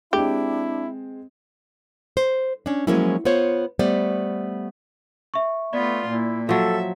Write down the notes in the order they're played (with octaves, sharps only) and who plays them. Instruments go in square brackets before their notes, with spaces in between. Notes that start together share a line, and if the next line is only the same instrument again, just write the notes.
[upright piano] G#3 C4 [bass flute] D4 [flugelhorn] E4 [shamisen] G4
[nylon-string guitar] C5
C#4 D4
F3 F#3 G#3 A#3 C#4 E4
B3 F4 C5 C#5
G3 A3 B3 C5 D5
[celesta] E5 C#6
[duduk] A3 [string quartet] B3 F4 [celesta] D5
[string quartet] A#2 [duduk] E4
[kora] F3 F#3 [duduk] A4 [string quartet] E5